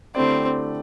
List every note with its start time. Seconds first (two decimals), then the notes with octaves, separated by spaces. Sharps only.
0.15 D3 A3 C4 E4 G4 D5